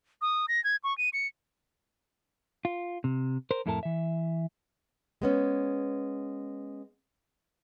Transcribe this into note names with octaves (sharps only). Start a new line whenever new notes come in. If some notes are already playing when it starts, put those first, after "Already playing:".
D#6
A#6
G#6
C#6
D#7
C#7
F4
C3
A#4 C5
F2 A2 E4 A4 A#4 A5
E3 E5
G#3 B3 C#4